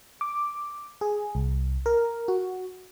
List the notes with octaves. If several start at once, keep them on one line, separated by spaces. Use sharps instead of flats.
D6
G#4
C2
A#4
F#4